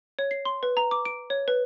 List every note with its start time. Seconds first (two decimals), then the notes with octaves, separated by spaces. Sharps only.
0.19 C#5
0.31 C7
0.45 C6
0.63 B4
0.77 A#5
0.91 D6
1.05 D7
1.30 C#5
1.48 B4